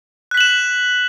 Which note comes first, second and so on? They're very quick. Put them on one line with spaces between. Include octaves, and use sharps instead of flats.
F#6 B6 F#7 E7